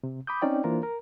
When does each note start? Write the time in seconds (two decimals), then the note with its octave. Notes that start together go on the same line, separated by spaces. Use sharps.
0.03 C3
0.27 B5 D6 D#6 G6
0.42 C4 C#4 D#4 D5 G5
0.64 E3 A#3 D4 F4 A#4 C5
0.83 A#4